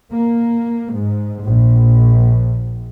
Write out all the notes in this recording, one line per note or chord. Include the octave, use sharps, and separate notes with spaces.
A#3
G#2
A#1